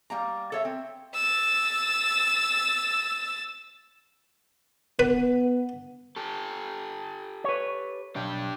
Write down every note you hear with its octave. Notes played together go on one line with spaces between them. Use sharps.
G3 A#3 A#5
A4 C#5 E5
C4
E6 A6
B3 B4
G4 A4
B4 C#5
B1 D4 G4